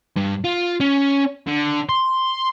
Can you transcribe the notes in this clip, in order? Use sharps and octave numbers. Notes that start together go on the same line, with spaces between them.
G2
F4
C#4
D3
C6